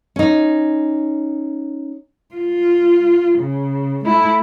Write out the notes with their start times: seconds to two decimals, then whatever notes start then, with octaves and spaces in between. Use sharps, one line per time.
0.16 C#4 D#4
2.35 F4
3.38 C#3
4.04 A3 E4